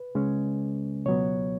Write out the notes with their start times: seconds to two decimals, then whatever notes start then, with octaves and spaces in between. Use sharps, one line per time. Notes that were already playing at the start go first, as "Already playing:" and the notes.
Already playing: B4
0.15 C#2 C#3 G#3 C#4
1.06 C#2 B2 F#3 B3 C#5